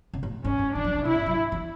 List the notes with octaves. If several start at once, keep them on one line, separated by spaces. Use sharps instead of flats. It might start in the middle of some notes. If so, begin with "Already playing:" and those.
C#3
A2
G#2 C#4
A2
E3 D4
F#3
C#3
B2 E4
G#2
F#3
E3